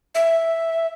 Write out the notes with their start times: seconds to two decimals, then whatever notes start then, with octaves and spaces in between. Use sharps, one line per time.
0.15 E5